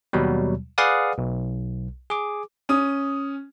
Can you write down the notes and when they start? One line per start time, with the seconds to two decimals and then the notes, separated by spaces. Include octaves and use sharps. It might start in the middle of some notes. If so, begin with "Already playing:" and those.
0.13 D#2 B2 F#3 G3
0.78 G#4 B4 D5 F5 F#5 D#6
1.18 B1
2.10 G#4 D6
2.69 C#4 D#6